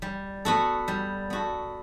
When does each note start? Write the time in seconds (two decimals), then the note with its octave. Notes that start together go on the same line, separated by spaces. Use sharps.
0.02 G3
0.45 B3 F#4 A4
0.88 G3
1.30 B3 F#4 A4